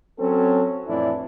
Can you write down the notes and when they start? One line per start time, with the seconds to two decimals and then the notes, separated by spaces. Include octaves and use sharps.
0.19 F#3 C4 C#4 A4
0.88 F2 A2 E3 D4 E4